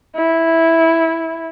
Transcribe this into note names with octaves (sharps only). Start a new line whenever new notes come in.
E4